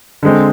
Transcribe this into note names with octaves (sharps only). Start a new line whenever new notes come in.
D3 G#3 C4